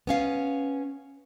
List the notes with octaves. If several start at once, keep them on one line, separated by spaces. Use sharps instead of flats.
B3 C#4 F5